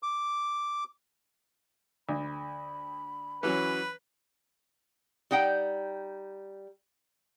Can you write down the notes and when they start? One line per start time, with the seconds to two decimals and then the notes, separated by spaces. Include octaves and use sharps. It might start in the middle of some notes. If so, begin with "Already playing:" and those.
0.03 D6
2.09 D2 B5
3.43 E3 F#3 C#4 B4
5.31 G3 D#4 F#5 G5